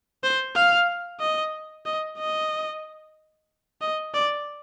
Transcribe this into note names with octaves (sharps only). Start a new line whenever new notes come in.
C5
F5
D#5
D#5
D#5
D#5
D5